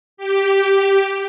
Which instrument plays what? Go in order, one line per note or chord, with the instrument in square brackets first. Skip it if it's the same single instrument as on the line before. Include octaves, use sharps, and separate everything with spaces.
[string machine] G4